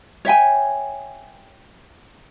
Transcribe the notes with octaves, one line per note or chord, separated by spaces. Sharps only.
C#5 E5 G5 G#5